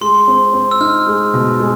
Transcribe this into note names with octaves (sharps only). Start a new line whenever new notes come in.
G#3 C6
C4
C4
E6
D#4 F6
G#3
B2
G#3